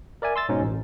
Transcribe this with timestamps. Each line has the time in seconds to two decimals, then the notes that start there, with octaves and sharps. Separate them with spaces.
0.22 A#4 D5 E5 G#5
0.36 C6 E6 A6
0.49 G#2 B2 G#3 C#4 D#4
0.62 A1